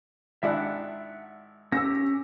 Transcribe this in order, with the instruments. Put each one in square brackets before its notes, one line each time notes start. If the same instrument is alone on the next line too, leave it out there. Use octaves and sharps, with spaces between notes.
[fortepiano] G#1 D4 E4 [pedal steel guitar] E5 F#5 F#6
[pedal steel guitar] C#4 G4 [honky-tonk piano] E6 A#6